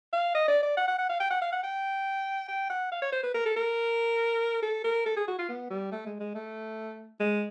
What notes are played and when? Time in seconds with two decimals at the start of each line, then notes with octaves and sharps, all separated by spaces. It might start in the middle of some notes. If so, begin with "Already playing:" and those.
0.13 F5
0.35 D#5
0.48 D5
0.63 D5
0.77 F#5
0.88 F#5
0.99 F#5
1.09 F5
1.20 G5
1.31 F#5
1.41 F5
1.52 F#5
1.63 G5
2.48 G5
2.70 F#5
2.91 F5
3.02 C#5
3.13 C5
3.23 B4
3.34 A#4
3.46 A4
3.56 A#4
4.63 A4
4.84 A#4
5.06 A4
5.17 G#4
5.27 F#4
5.38 F4
5.49 B3
5.70 G3
5.92 A3
6.06 G#3
6.20 G#3
6.35 A3
7.20 G#3